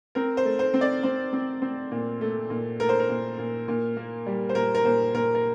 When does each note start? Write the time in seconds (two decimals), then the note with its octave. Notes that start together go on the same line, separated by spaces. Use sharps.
0.15 C4 A#4
0.37 C5
0.45 A3
0.59 C5
0.74 C4
0.81 D5
1.03 C4 C5
1.33 C4
1.62 C4
1.91 A#2
2.21 A3
2.50 A#2
2.79 A3 A#4
2.89 C5
3.00 A#4
3.09 A#2
3.38 A#2
3.68 A#2
3.97 A#3
4.27 G3
4.49 C5
4.55 A#2 A#4
4.75 A#4
4.85 A#2 C5
5.14 A#2 A#4
5.35 A#4